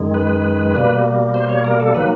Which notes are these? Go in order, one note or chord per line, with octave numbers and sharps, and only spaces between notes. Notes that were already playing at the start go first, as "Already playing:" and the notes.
Already playing: F#2 D#3 G#3
B4
B2 G3 A#3
C5
C#5
A#4
A4
D#3 F#3 A#3 B4